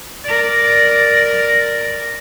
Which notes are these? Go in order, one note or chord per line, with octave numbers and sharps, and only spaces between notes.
A#4 D5